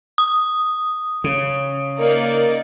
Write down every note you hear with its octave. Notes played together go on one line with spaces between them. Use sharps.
D#6
C#3
A#3 D#4 A#4 D5